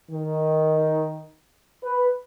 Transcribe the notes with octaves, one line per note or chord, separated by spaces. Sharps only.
D#3
B4